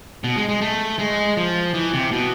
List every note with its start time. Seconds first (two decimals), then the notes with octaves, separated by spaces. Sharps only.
0.24 B2
0.37 G#3
0.49 G#3
0.61 A3
0.99 G#3
1.37 F3
1.74 E3
1.93 C3
2.12 B2